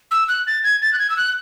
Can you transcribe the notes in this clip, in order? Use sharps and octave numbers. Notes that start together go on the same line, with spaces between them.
E6
F#6
A6
G#6
A6
F#6
G#6
E6
F#6